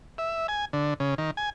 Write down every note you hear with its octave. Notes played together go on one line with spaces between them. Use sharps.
E5
G#5
D3
C#3
D#3
G#5